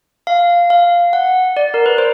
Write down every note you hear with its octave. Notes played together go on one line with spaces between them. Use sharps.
F5
F5
F#5
D5
A#4
B4
C5